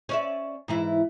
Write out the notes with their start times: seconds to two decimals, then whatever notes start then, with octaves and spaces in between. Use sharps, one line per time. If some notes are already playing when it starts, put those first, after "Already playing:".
0.09 C#4 D5 E5
0.68 G#2 E3 E4